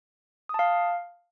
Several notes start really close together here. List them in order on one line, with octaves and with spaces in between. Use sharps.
D#6 A5 F5